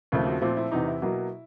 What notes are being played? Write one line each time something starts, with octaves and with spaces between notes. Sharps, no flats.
D#2 C#3 F3 A3 C4
F#4
A#2 F3 A3 C4 F4
E4
E2 C3 E3 D#4
E4
B2 F#3 A#3